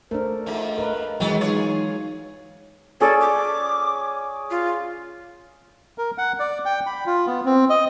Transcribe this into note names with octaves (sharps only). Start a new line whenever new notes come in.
A3 D4 A#4 C5
G#2 F3 E5
A#4 B4 D#5
D#3 E3 F#3 G#3 B3 C4
D#4 F4 G#4 C#5
C#4 G#4 A4 D5
D6
F4
A#4
F#5
D5
G5
B5
F4
B3
C4
D#5